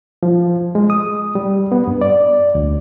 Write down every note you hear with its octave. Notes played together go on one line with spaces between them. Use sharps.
F3
G#3
D#6
G3
B3
G2
D5
D2